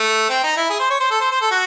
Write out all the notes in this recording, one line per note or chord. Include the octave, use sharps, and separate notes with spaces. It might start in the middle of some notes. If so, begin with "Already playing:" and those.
Already playing: A3
C4
D#4
E4
G#4
C5
C#5
C5
A4
C5
C5
A4
F#4